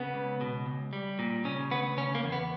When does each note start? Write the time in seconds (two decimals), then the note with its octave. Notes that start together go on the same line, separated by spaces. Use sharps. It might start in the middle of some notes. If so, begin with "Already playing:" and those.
Already playing: C#3 B3
0.14 C#2
0.41 B2
0.66 C#2
0.93 G3
1.19 A#2
1.45 C#3 C#4
1.71 D2 B3
1.97 C#3 C#4
2.15 A#3
2.24 E2
2.32 B3